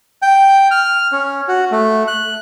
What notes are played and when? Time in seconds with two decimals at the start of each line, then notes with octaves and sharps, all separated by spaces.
0.22 G5
0.71 F6
1.12 C#4
1.48 F#4
1.72 A3
2.08 F#6